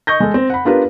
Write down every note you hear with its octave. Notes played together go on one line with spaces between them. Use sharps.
D#5 C#6 G6 A#6
G#3 A4
C4
F#5 B5
B3 D4 F4 G4 A#4 B4